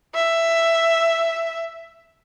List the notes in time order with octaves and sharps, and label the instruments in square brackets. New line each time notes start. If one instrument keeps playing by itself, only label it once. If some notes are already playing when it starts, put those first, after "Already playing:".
[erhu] E5